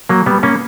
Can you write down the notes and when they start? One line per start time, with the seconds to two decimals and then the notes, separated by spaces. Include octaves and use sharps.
0.09 F#3 A#3
0.26 G3 B3
0.43 A#3 C#4